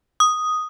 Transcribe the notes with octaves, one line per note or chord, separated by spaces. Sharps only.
D#6